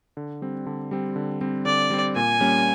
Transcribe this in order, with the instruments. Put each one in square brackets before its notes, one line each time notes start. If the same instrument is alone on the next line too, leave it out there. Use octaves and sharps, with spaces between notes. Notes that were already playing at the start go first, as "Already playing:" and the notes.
[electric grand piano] D3
G3 C4
D3
G3 C4
D3
G3 C4
[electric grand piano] D3 [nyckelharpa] D5
[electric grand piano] G3 C4
[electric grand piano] A#2 [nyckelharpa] G#5
[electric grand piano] G3 A#3 C#4